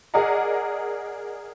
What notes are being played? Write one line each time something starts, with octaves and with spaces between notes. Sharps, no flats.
G#4 A#4 D5 D#5 F#5 A#5